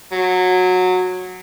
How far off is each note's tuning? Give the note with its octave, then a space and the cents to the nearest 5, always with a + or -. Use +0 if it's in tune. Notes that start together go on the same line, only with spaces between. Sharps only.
F#3 -15